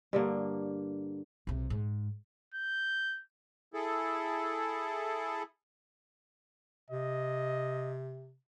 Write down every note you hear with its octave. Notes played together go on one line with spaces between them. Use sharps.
G2 D3 A#3
B1 C3
G#2
G6
E4 G#4 A4
C3 D#5